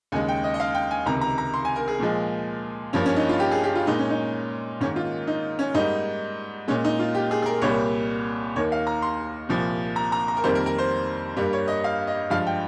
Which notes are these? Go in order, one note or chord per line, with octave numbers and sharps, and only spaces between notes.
D#2 C#3 G#3 G#5
G5
D#5
D#5
F5
G5
G#5
C#2 C3 D#3 A#5
A#5
A#5
C6
G#5
A#4
G#4
A#2 F3 G#3
G2 F3 A#3 C#4
C#4
D#4
F4
G4
G#4
G4
F4
A#2 G#3 D#4
C#4
D#4
G#2 D#3 A#3 C#4
F4
D#4
C#4
G#2 G3 A#3 D#4
A#2 G#3 C#4
D#4
F4
G4
G#4
G#4
A#4
C2 A#2 G3 A#3 C#5
D#2 D#3 A#3 C#5
F5
A#5
C6
C2 A#2 F3
A#5
A#5
A#5
A#4
F2 D#3 G3 A#3 C5
A#4
A#4
C5
G2 G3 A#3
C#5
D#5
F5
D#5
G2 F3 G#3 F5
G5